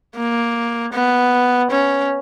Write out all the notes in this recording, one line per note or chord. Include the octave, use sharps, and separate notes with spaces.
A#3
B3
C#4